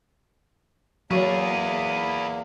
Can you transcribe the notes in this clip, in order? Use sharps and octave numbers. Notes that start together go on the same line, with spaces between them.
E2 F#3 A#3 E4 G#4